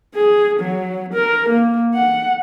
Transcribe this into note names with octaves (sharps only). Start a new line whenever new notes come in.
G#4
F#3
A#4
A#3
F#5